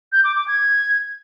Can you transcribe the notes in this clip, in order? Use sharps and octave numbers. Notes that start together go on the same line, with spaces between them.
G6
D6
D6
G#6